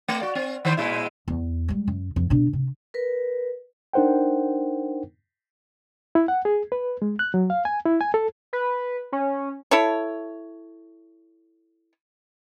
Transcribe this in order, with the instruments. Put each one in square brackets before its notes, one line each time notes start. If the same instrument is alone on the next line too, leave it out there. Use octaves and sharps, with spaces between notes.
[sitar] A3
F#4 D5
C4
D#3 C5
A#2 G#3 E4
[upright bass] E2
G3 G#3
F#2
F2
B2 D4
C3
[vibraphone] A#4 B4
[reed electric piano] D4 D#4 A#4 C5 F#5 G5
E4
F#5
G#4
B4
G#3
F#6
F#3
F5
G#5
E4
G#5
A4
[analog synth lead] B4
C#4
[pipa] E4 A4 C#5